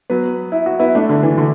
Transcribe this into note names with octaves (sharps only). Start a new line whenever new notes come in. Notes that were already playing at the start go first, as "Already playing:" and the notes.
F#3 B3
E4
F#4
B3 E4
A3 D4
D3
E3
D3